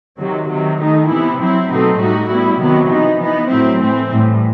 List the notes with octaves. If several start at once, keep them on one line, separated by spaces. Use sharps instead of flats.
C3 D#3 F#3
C3 D#3 F#3
D#3 A3 D#4
C3 E3 B3 E4
F#3 C4 E4
B2 F#3 A3 C4 D#4
A2 G3 D#4 F#4
A2 G3 B3 E4
C3 D#3 F#3 B3
E3 B3 D#4
E3 B3 D#4
A2 F#3 C4 E4
E3 A3 C4
A2 E3 G3